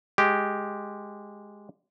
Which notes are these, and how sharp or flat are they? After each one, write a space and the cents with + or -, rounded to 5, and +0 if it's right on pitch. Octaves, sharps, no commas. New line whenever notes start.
G#3 +0 G4 -5